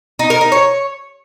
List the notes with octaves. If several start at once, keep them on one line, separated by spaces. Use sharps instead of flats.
D#4
A#4
D#4
C#5